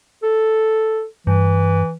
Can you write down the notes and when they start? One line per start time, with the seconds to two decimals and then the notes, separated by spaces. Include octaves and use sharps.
0.23 A4
1.27 G2 E3